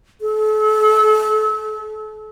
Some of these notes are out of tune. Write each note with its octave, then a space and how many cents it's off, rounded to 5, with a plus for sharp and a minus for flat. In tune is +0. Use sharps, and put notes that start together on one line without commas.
A4 -35